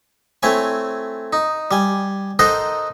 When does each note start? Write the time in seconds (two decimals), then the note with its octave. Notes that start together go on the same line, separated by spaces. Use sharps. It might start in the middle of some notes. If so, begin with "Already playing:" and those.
0.43 A3 C4 E4 C#5 G#5
1.33 D#4
1.71 G3 G#5
2.39 D#4 A4 A#4 C5 D#5 F#5